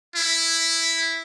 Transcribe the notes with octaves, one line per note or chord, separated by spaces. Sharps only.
E4